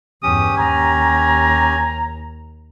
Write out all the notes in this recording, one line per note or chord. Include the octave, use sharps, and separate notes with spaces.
E2 G2 C#4 G4 D#6
D#2 G#5 A#5